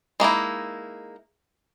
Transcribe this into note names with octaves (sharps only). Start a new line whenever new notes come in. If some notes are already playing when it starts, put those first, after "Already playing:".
G#3 A#3 D#4 E4